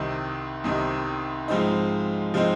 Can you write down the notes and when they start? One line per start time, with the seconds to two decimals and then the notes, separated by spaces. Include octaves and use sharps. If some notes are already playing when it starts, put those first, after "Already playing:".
Already playing: C2 C3 D#3
0.64 C2 C3 D#3
1.48 G#2 F3 G#3 C4 D#4
2.34 F3 G#3 C4 D#4